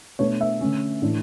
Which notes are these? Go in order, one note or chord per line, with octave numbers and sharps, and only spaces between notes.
B2 A3 D4 C#5
E5
D3 A3 C#4
A2 E3 A3 D4